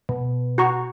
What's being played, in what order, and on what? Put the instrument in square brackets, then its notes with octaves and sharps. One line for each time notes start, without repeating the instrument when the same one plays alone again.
[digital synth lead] B2
[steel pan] F#4 A#5 C#6